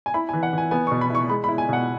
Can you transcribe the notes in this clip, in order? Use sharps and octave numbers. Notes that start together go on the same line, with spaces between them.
G#5
E4 B5
E3 G#5
F#5
E3 G#5
B3 G#5
B2 C#6
B5
E4 C#6
G#3 B5
E4 B5
G#5
B2 F#5